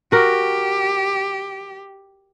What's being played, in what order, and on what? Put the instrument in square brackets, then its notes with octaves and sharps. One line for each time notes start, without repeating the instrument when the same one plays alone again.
[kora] F#4 A#4 [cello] G4